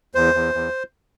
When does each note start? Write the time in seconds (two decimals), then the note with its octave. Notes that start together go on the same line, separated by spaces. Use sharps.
0.15 E2 C5
0.34 E2
0.54 E2